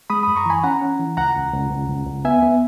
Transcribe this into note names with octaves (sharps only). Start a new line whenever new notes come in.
G#3 B5 D#6
F#2 B5 D#6
A#5 C#6
E3 G#5 B5
C#4 F#5 A#5
C#4
E3
C#2 F#5 A#5
C#2
C#2
C#2
C#2
C#2
B3 E5 G#5
B3